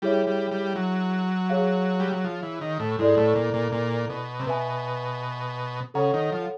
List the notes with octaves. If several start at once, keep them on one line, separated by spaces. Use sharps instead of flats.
G3 E4 G#4 C#5 E5
G3
G3
F#3
G#4 C#5 F5
G3
F#3
F3
E3
D#3
A2
G#2 E4 A4 D5
A2
A#2
A#2
A#2
B2
C3
B2 B4 E5 G#5
C#3 A4 C#5 F#5 A#5
D#3
F3